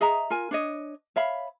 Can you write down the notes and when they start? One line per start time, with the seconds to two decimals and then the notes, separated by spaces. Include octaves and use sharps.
0.01 G#4 D#5 E5 A#5
0.30 F4 A#4 G#5
0.51 D4 C#5 D#5
1.16 C#5 E5 F5 B5